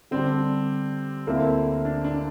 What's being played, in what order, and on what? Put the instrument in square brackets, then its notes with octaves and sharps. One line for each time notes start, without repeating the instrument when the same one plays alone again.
[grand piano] D3 G3 D4 G4 [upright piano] C4
[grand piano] D2 D3 A3 C4 E4 [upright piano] A#3
[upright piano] D4
D4